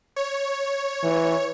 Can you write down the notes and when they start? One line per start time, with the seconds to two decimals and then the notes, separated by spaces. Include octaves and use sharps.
0.16 C#5
1.03 E3